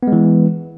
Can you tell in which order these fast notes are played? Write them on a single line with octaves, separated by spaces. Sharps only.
B3 G#3 E3